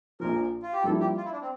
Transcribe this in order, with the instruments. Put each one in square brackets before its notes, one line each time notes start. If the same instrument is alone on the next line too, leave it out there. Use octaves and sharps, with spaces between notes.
[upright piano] A#1 A#2 F3 [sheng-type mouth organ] A#4
[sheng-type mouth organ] F4
G4
[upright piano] G2 F3 A#3 E4 [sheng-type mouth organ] A4
[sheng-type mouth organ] G4
F4
E4
D4
C4